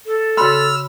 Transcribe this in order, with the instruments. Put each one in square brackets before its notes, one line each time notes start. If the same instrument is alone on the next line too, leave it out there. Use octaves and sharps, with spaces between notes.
[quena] A4
[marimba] C#3 F#4 C6 [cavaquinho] B5 [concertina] E6 F6